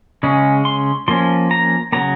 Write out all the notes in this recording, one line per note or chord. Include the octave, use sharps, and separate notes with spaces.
C#3 G#3 C#4
C6
F3 A#3 C#4 C6
A#5
C#3 F#3 A#3 A#5